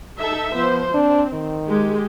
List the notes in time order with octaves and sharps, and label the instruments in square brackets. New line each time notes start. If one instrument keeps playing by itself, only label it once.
[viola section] D#4 A4 E5
[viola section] F3 C5 [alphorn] B3
[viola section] C4 [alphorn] D4
[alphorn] D#3
[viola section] G#3 G4